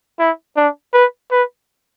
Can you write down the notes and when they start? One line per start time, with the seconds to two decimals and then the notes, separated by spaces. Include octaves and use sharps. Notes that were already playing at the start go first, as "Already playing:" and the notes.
0.19 E4
0.56 D4
0.94 B4
1.31 B4